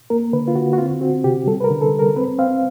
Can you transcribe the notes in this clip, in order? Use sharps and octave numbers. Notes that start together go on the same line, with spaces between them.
A#3 A#4
D3 B4
F4
D3 F#4
F#4
C4 F4
C4 F#4
C3 G4
G3 A4
B4
A#4
D3
A4
G3
A#4
C4 B4
C4 F5